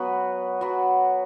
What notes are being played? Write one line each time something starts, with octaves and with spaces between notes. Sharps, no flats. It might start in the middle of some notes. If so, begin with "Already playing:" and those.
Already playing: F#3 B3 F#4 B4
F#3 B3 F#4 B4